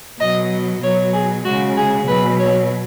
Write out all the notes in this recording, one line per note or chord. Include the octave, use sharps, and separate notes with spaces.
B2 F#3 D#5
B2 F#3 C#5
G#4
C#3 G#3 F#4
G#4
B2 F#3 B4
C#5